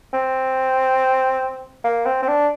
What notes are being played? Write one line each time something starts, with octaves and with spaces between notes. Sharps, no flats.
C4
A#3
C4
C4
D4